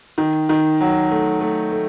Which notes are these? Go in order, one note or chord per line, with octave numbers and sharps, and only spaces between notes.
D#3
D#3
F#3
A3
A3
A3